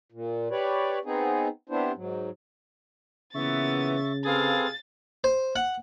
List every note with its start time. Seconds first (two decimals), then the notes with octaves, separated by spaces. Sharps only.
0.12 A#2
0.51 G4 B4 C#5 D5
1.05 B3 C4 D#4 G#4
1.69 B3 C4 D4 E4 G4 C5
1.95 G#2 F#3
3.35 A#2 C#3 E3 B3 E5 C#6 A6
4.25 C3 C4 G#4 A4 B4 F5 A6
5.24 C5
5.56 F#5